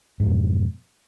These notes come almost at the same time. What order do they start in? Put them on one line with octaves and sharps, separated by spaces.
G#2 F#3 F2 B2